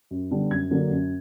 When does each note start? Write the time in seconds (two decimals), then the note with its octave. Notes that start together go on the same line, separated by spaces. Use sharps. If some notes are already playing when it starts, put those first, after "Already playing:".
0.11 F#2
0.31 D3 G3 B3 D4
0.51 F#2 G#6
0.71 D3 F#3 A#3 D4
0.91 F#2